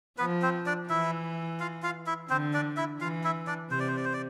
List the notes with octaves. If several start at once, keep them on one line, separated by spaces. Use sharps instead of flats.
F3 B3 B4
C4 C5
D4 D5
E3 E4 E5
F4 F5
F4 F5
E4 E5
D3 C4 C5
D4 D5
E4 E5
E3 F4 F5
E4 E5
D4 D5
C3 C5
D5
C5
D5
C5
D5